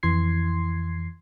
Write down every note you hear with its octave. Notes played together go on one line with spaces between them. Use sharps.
F2 E3 C6 G#6 C7